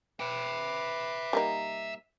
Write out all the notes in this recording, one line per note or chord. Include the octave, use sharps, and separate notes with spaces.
B4 E5 G5 D6
G3 A#3 D#4